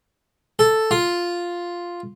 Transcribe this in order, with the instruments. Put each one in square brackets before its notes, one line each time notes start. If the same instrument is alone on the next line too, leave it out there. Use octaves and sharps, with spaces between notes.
[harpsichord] A4
F4